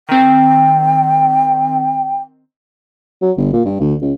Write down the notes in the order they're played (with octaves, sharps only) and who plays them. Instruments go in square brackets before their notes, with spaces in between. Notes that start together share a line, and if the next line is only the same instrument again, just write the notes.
[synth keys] D#3 C4 [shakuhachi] G5
[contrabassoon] F#3
G1
A#2
G2
D2
C#2